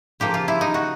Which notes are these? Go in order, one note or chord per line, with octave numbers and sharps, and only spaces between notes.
C#3 F3 A#3 G4
F4
E4
D#4
F#4